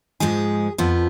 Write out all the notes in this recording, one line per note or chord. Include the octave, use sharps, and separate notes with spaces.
G#2 F3 G#3 G#4
F2 F3 B3